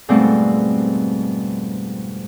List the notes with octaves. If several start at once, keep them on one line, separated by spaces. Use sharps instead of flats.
F2 G#2 B2 G3 A3 C4